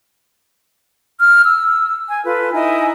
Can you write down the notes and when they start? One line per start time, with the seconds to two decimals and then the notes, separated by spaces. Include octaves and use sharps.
1.18 F6
1.44 E6
2.09 G#5
2.24 F4 A4 B4
2.52 D#4 E4 D#5 G#5